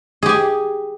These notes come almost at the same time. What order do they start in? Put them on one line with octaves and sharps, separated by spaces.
G#4 G4 G#5